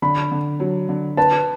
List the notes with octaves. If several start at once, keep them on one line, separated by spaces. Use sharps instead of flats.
D3 B5
D3
F#3
D3
B4 A5